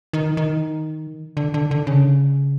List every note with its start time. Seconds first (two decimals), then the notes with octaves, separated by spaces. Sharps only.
0.13 D#3
0.37 D#3
1.37 D3
1.54 D3
1.71 D3
1.87 C#3